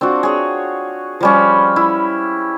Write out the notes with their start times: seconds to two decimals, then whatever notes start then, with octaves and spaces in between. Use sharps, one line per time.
0.01 C4 D4 F4 F#4
0.23 G#4 C#5
1.20 F3 G3 C#4
1.76 E4